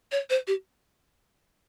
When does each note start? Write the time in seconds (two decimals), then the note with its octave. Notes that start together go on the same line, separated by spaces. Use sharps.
0.12 C#5
0.30 C5
0.47 G4